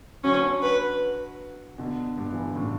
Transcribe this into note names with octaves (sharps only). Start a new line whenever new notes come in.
D3 F#3 C#4
B4
B2 D3
G2 B2
E3
D3
A2 C#3